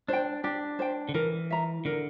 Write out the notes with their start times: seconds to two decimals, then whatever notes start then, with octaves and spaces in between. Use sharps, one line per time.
0.08 D4 C5 G5
0.44 D4 G4
0.79 C5 G5
1.09 D3
1.14 E3 A#4
1.50 E5 A#5
1.85 D3 A#4